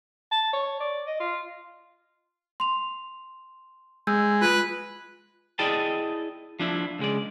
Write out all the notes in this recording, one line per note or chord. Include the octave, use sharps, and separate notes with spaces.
A5
C#5
D5
D#5
F4
C6 F7
G#3 E6 G6
F4 B4
E4 G#4 D5 D#5 G5 A5
F3 D4 E4
C#2 G#3 D5